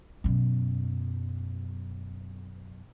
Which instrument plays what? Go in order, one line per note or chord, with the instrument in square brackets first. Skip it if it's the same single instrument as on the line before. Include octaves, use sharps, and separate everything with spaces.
[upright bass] F#2 B2